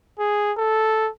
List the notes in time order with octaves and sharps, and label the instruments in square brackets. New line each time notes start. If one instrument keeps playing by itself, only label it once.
[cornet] G#4
A4